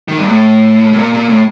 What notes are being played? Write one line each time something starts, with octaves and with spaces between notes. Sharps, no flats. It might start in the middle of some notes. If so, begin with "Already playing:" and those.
D#3
G2
A2
A2
A#2
A#2
A2